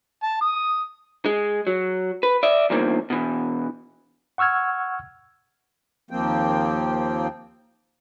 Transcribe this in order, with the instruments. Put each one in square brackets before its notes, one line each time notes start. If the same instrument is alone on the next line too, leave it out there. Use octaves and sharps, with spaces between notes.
[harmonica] A5
D#6
[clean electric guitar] G#3
F#3
B4
D5 E5
E2 G2 D#3 F3 A#3
B2 E3
[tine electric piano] F#5 C#6 E6 F6 G#6
[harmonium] D#2 F3 A#3 C4 G5